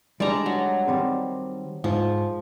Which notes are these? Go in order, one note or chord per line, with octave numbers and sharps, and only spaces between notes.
G3 G#3 D4 D5 A5 A#5
F#3
D#3 G3 C4
G#2 F3